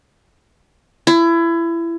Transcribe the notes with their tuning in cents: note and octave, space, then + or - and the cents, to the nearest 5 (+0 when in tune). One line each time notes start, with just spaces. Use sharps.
E4 +25